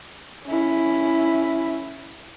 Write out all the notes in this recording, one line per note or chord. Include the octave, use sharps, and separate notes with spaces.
C#4 E4